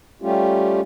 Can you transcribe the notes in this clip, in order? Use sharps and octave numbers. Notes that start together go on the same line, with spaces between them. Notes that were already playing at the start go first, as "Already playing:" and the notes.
G3 A3 C#4 F4 G4